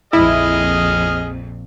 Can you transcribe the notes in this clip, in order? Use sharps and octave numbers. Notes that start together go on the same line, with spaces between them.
A#1 F2 E4 G#4 D#5 F6